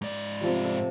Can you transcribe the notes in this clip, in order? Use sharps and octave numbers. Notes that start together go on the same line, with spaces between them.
G#2 D5
C3 F3 G3
A4